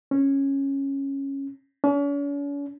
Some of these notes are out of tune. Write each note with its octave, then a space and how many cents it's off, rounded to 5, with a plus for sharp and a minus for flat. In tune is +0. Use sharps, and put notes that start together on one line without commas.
C#4 -10
C#4 +45